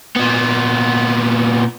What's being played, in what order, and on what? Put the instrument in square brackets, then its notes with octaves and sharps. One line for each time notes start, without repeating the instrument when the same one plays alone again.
[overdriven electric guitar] A#2 B3